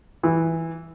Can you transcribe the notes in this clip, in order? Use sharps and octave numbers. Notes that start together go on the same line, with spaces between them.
E3